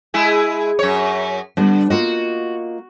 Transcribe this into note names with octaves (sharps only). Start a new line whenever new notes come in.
G#3 E4 G#4
F#2 C#5
D3 G3 B3 D4
A#3 F4 F#4 D#5